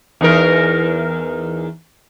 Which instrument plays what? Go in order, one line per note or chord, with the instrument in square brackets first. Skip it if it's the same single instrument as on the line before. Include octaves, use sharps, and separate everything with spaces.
[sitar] E2 D#4 A#4